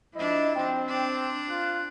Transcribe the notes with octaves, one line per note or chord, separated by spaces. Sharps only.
F3 D4 E4 D#5
C4 G5
D4
F4 F#6